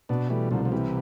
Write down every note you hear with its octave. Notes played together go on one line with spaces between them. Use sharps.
B2 B3 D4
E3 G3 A3
C2 D3 F3
F3
C3 E3 G3